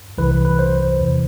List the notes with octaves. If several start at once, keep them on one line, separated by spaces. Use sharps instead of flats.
C2 C3 E3 B4
B4
B4
C5
E2 C3 E3